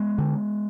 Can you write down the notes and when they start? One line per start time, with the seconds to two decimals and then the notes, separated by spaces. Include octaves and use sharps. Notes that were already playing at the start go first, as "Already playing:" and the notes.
Already playing: G#3 B3
0.18 D3